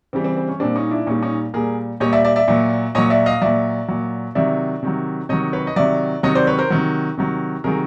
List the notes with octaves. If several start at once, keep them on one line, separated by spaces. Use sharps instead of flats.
C#3 E3 G3 C4
C4
C4
C#4
A#2 G3 C4 D4
C#4 D#4
D4 E4
A#2 G3 C#4 D#4
C#4 D#4
A#2 G3 G#4 A#4
A#2 G3 C#5 D#5
D5 E5
D5 E5
D5 E5
A#2 F#3
A#2 F#3 C#5 D#5
D5 E5
D#5 F5
A#2 F#3 D5 E5
A#2 F#3
C3 D#3 F#3 D5 E5
C3 D#3 F#3
C3 D#3 F#3 C#5 D#5
B4 C#5
D#5
C3 D#3 F#3 D5 E5
C3 D#3 F#3 C#5 D#5
C5 D5
B4 C#5
A#4 C5
C3 D#3 F#3
C3 D#3 F#3
C3 D#3 F#3 G#4 A#4